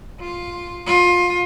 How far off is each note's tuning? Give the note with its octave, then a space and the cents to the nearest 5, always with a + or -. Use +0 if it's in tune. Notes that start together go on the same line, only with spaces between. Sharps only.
F4 +5
F4 +20